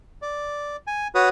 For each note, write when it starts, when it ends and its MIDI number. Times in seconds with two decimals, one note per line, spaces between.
0.22 0.77 74
0.87 1.08 80
1.15 1.29 66
1.15 1.29 71
1.15 1.29 73
1.15 1.29 87